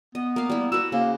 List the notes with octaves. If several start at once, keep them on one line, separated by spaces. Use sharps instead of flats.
B3 D#5
A#3 F5
G3 E4
F#4 B4 E6
C#3 A#3 C5